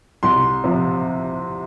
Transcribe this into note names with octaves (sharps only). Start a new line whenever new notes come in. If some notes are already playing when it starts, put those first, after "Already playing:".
C2 C6
C3 F3